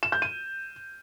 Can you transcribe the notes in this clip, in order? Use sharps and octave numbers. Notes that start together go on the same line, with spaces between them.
E7
G6
D#7